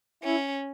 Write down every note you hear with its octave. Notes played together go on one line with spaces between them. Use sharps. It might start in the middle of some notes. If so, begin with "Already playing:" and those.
C#4 E4